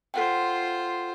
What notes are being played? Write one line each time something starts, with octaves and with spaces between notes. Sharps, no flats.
F4 A4 C5 F#5 G5